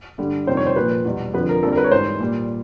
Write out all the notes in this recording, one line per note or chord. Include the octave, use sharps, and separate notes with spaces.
G2 D3 G3
F2 C3 D#3 G3 C5
C#5
C5
A#2 F3 B4
E2 B2 G3
F2 D3 F3 B4
A#4
F2 D3 G3 A4
A#4
B4
C#5
G#2 E3 G3 C5
A#2 G3